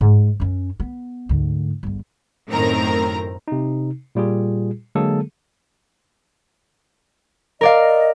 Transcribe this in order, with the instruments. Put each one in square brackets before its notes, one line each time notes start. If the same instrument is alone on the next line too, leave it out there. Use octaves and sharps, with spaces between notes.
[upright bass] G#2
F#2 C#4
B3
D2 G#2
G1 E2
[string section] F#2 A2 D#3 C4 A#4 A#5
[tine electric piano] C3 D#4
A#2 G3 F4 G#4
D3 F#3 G#3 A#3 G#4 A4
[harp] A#4 D5 F5 [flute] D#5